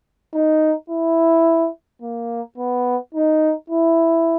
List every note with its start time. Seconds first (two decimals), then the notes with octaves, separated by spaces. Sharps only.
0.34 D#4
0.90 E4
2.02 A#3
2.57 B3
3.14 D#4
3.70 E4